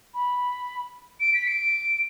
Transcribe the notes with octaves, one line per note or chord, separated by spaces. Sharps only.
B5
D7
B6
D7